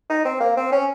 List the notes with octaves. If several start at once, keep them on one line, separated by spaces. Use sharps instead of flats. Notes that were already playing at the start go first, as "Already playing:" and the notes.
D#4
C4
A#3
C4
C#4